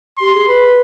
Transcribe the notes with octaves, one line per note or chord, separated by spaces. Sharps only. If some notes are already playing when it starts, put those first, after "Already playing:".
G4 C6
G#4
B4 B5